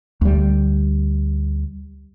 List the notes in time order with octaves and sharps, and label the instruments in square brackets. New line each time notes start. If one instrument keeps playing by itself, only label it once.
[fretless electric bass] D2 G3